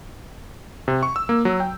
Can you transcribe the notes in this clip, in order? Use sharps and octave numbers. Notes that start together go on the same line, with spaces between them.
C3
C#6
E6
A#3
F#3
G5